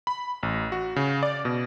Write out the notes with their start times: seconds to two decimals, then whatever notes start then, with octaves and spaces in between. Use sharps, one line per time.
0.07 B5
0.43 A1
0.72 F#4
0.96 C#3
1.23 D5
1.45 B2